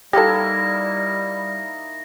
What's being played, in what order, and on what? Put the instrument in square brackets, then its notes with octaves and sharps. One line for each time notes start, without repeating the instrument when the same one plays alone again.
[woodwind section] G3 [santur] A#3 D#4 E4 [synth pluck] G4 A4 [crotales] A#6